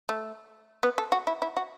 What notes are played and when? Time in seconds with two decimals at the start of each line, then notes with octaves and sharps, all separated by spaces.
0.09 A3
0.83 B3
0.98 A4
1.12 F#4
1.27 E4
1.42 E4
1.57 F#4